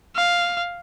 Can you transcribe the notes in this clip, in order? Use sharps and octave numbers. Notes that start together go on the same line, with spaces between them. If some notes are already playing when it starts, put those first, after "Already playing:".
F5